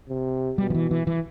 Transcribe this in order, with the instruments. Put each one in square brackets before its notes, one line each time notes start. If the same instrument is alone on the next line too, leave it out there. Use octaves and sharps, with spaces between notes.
[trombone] C3
[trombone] B2 [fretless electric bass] G3
[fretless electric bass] F3
E3
E3
E3